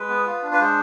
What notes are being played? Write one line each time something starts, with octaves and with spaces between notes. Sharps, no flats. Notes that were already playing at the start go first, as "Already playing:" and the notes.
Already playing: G#3 B4
B3
F4
D4
B4
G#3 C5